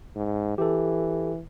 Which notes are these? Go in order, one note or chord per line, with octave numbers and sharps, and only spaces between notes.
G#2
E3 G4 A4